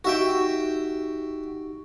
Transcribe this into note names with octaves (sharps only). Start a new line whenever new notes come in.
D#4 F#4 G4 E5 G5